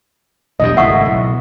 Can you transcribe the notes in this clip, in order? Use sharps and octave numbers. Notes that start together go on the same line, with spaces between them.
B1 E2 G2 D#5
G#1 C#2 A2 E5 F#5 C#6 D#6
B1